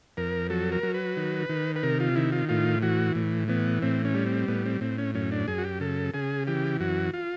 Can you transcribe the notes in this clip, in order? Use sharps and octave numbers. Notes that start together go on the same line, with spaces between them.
F2 A#4
F#3 A4
A#4
F#3
B4
D#3
D#3
B4
C3 A#4
F4
D#3 E4
F4
A2 F4
E3 F#4
A2
E3 B3
A2 C4
C#4
G3
C4
A2 B3
C4
A2 C4
C#4
F#2 C#4
D4
F#2 G#4
F#4
G4
C#3 A4
C#3 G#4
E3 G4
F#2 F#4
F4